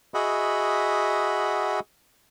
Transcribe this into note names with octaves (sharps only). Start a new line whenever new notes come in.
F#4 G#4 D#5 E5 F#5 B5